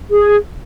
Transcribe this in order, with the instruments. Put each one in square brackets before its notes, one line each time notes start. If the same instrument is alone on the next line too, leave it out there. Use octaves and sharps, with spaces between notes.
[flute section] G#4